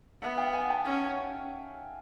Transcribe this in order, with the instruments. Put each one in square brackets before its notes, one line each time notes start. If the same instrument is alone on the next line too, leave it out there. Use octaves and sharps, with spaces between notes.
[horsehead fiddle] B3 [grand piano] E5 F#5
[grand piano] F5 G5
F#5 G#5
G5 A5
[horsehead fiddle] C#4